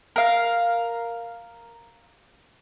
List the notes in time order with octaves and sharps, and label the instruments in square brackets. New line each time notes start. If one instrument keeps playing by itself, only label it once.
[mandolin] A#4 F5